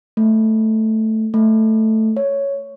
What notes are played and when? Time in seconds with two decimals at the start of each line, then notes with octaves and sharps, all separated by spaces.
0.17 A3
1.34 A3
2.17 C#5